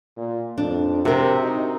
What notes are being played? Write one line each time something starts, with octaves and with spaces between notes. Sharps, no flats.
A#2
F2 D4
C3 F#4 A#4
D#4